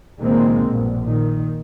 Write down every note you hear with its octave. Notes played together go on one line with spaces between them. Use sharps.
C#2 A#2 D#3 G#3 A#3 C4
A#1 G2 B2
A#2 D#3